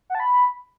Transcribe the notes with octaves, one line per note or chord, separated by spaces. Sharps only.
F#5
A5
B5